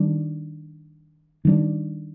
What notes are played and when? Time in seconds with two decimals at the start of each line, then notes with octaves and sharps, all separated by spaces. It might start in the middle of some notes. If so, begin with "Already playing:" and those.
Already playing: D#3 G3 D4
1.45 D#3 G3 D4